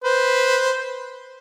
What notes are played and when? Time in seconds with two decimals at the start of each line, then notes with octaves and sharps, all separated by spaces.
0.04 B4 C5